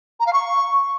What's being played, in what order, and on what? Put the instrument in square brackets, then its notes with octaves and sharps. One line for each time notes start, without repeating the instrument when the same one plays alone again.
[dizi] A#5
F5
C#6